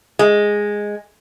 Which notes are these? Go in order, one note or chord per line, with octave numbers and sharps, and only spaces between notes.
G#3